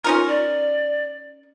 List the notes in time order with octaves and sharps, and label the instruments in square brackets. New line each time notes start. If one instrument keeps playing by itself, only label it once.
[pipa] C#4 D#4 A#4 [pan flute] F4
[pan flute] D5